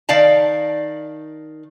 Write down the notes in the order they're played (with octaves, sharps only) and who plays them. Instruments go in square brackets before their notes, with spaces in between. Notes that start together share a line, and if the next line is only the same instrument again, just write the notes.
[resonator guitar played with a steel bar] D#3 D5 F5 A5